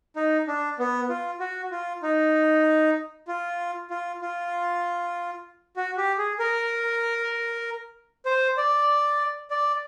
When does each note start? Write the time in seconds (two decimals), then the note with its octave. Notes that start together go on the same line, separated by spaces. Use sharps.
0.16 D#4
0.47 D4
0.79 B3
1.09 F4
1.40 F#4
1.71 F4
2.03 D#4
3.28 F4
3.90 F4
4.21 F4
5.76 F#4
5.98 G4
6.18 G#4
6.39 A#4
8.25 C5
8.57 D5
9.50 D5